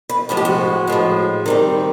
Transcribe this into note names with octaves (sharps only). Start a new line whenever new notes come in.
B4
A2 F3 G#3 F#4
G4
F#4
A2 F3 G#3
D#3 G3 C4